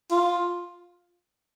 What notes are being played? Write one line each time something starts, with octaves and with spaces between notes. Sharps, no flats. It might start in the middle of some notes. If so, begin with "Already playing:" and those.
F4